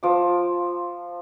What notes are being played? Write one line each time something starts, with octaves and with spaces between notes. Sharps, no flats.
F3 D6